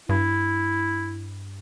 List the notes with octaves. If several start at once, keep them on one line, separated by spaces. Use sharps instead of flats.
G2 E4